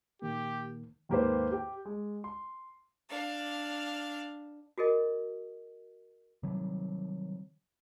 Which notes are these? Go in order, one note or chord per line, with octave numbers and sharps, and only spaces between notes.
A#2 D#3 A#3 G4
D#2 G#2 A#3 G4 B4 C5
G4 G5
G#3
C6
D4 F5
F#4 G#4 A#4 D#5
C3 D#3 F#3 G3